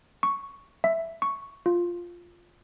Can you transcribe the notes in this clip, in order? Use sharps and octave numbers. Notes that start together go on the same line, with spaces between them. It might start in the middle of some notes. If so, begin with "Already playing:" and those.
C#6
E5
C#6
F4